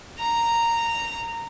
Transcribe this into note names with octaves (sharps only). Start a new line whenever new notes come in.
A#5